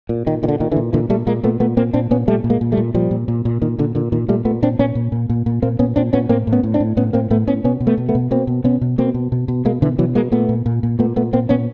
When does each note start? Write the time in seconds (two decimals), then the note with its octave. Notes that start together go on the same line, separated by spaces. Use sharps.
0.09 A#2
0.27 A#2 D#3
0.43 A#2 D#3
0.48 D3
0.60 A#2 D#3
0.72 D3 E3
0.76 A#2
0.93 A#2 D3 E3
1.09 A#2 G3 A3
1.27 A#2 G#3 A#3
1.44 A#2 A3 B3
1.60 A#2 A3 B3
1.77 A#2 A#3 C4
1.93 A#2 C4 D4
2.11 A#2 B3 C#4
2.27 A#2 G3 A3
2.44 A#2
2.50 G#3 A#3
2.61 A#2
2.72 G3 A3
2.77 A#2
2.94 A#2 F3 G3
3.11 A#2
3.28 A#2
3.45 A#2
3.62 A#2 D#3
3.78 A#2 D3
3.95 A#2 D3
4.12 A#2 D#3
4.28 A#2 G3 A3
4.45 A#2 A3 B3
4.62 A#2 C4 D4
4.79 A#2 B3 C#4
4.95 A#2
5.12 A#2
5.30 A#2
5.46 A#2
5.62 A#2 A#3 C4
5.79 A#2 B3 C#4
5.96 A#2 C4 D4
6.13 A#2 B3 C#4
6.29 A2 A#3 C4
6.47 A2
6.53 B3 C#4
6.63 A2
6.74 C4 D4
6.80 A2
6.97 A2 B3 C#4
7.13 A2 A#3 C4
7.30 A2 A3 B3
7.47 A2 B3 C#4
7.64 B2 B3 C#4
7.80 B2
7.87 A3 B3
7.98 B2
8.09 A3 B3
8.15 B2
8.31 B2 A#3 C4
8.47 B2
8.64 B2 B3 C#4
8.81 B2
8.98 B2 A#3 C4
9.14 B2
9.32 B2
9.48 B2
9.65 B2 G#3 A#3
9.82 B2 D3 E3
9.98 B2 E3 F#3
10.15 B2 G#3 A#3
10.32 A#2 A3 B3
10.49 A#2
10.66 A#2
10.83 A#2
10.99 A#2 A3 B3
11.16 A#2 A3 B3
11.33 A#2 A#3 C4
11.49 A#2 B3 C#4